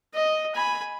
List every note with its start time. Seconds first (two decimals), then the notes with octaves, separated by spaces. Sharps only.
0.14 D#5
0.55 G#5 B5